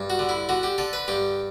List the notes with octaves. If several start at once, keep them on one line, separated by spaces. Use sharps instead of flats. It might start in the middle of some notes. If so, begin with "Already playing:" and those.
Already playing: G2
F#4
D3
E4
D3 F#4
G4
D3 A4
B4
G2 G4